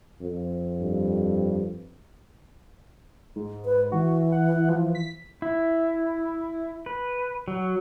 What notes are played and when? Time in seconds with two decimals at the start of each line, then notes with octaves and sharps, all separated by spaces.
0.21 F2
0.82 G2
3.36 G#2
3.65 B4
3.92 E3 F#4
4.32 F#5
4.69 F3
4.95 B6
5.42 E4
6.86 B4
7.48 F#3